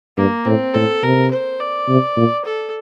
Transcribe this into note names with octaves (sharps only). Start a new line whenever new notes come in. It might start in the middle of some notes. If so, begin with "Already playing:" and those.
G2 A#3
A2 C4
A2 A4
C3 A#4
C5
D5
C3
A#2
A4